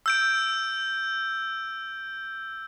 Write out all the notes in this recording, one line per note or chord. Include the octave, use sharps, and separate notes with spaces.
E6 G6 D7